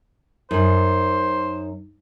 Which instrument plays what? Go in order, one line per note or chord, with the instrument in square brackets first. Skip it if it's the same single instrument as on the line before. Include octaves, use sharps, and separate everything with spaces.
[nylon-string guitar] F#2 [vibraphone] D#4 [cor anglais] C5